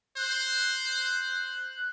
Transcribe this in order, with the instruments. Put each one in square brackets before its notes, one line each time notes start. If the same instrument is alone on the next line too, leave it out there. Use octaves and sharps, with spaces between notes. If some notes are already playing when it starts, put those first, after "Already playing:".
[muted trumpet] C5 [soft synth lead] F#6